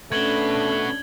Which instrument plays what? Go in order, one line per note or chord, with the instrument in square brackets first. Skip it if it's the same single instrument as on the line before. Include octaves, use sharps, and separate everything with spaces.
[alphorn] A3 [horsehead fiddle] C#4 D4 [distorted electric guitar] F#4 B4 [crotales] G#6 F#7 G7